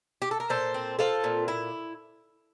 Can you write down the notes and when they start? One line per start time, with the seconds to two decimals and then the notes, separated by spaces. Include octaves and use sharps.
0.22 G4
0.31 A4
0.40 A#4
0.50 A#2 A4 C5
0.74 C4
0.99 C4 F4 A4
1.24 A#2
1.48 E4